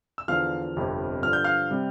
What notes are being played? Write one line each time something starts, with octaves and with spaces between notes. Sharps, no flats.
E6
E2 D3 F3 F5 F6
G1 F2 C3
G2 D3 F3 F6
G6
F5 F6
C3 G3